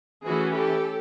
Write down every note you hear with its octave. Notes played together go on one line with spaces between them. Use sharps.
E3 A3 C#4 F#4 G#4
G4 A4